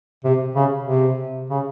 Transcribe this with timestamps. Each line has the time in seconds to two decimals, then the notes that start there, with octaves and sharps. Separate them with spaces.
0.24 C3
0.55 C#3
0.87 C3
1.50 C#3